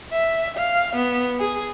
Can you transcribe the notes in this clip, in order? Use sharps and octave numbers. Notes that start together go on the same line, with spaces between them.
E5
F5
B3
G#4